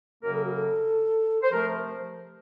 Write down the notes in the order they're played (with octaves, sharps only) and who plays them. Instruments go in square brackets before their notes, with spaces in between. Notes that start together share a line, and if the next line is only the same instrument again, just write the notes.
[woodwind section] F#2 C#3 F#3 A#3 A#4
A4
F#4
A4
C5
C3 F3 A3 A#4